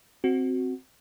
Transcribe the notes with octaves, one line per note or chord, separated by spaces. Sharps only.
C4 F#4